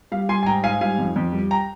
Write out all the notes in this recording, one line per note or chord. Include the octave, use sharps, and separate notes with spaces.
G3 F5
G3 G#5 C6
G#5
G#2 G5 A#5
G#2 F5 G#5
G3 F5 G#5
F2
F2
G3
G5 A#5